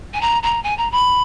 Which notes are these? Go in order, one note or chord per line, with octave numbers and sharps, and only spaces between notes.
G#5
A#5
A#5
G#5
A#5
B5